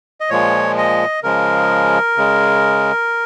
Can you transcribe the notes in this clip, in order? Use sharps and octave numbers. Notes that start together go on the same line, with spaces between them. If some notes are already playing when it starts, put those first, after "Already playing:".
D#5
A#2 F3 G#3 C#5
D#5
C#3 F3 G#3 A#4
C#3 G#3